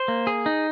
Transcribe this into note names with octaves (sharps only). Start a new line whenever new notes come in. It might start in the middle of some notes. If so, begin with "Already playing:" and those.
Already playing: C5
A#3
G#4
D#4